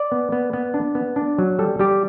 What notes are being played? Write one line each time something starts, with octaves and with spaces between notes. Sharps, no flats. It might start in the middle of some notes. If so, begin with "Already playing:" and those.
Already playing: D5
B3
B3
B3
D4
B3
D4
F#3
G3 A4
G3 G4